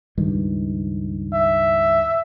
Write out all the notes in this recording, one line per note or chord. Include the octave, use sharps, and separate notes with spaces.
C#2 G2 D#3
E5